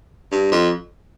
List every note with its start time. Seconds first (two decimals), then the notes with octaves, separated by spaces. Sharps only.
0.32 G2
0.52 F2